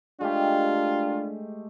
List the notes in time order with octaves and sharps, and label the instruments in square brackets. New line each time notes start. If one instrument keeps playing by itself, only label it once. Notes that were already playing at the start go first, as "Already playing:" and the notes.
[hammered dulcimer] G#3 A3 G4 [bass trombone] D4 [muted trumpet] F4